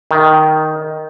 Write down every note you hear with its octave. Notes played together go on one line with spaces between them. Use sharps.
D#3